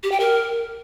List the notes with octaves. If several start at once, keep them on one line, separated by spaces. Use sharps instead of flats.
G4
G5
A#4